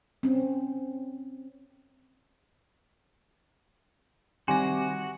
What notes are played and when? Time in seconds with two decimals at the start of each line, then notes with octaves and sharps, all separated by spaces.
0.23 C4 C#4
4.48 C3 D#3 G3 F#4 G#5 C6 D6 A#6